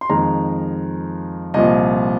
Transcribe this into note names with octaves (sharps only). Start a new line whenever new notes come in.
C6
F2 D#3 G#3 A#5
C2 A#2 F3 D#5